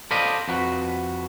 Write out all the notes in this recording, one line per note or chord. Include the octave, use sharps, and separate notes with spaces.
A4 C5 D5 D#5 F5 B5
F2 F#4 B4